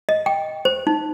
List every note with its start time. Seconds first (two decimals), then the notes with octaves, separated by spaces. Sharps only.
0.09 D#5
0.26 G5
0.65 C5
0.87 D#4